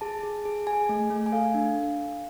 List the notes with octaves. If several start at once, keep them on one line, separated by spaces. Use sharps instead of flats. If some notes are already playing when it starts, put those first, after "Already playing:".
G#4 A5
G#4
G#4
G#4 G#5
A3
A3
G#5
A4 F5
D4